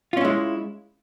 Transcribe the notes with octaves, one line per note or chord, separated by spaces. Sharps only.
G#3 C#4 E4 F4